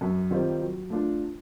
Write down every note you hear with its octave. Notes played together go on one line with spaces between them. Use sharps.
F#2
D#3 G3 C4 F4
F#3
A3 D4 F4